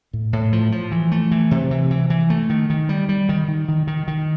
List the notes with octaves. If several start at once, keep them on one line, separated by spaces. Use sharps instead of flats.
A2
A2
F3
F3
E3
A3
E3
C3
E3
E3
E3
A3
D#3
D#3
G3
G3
D#3
D#3
D#3
D#3
D#3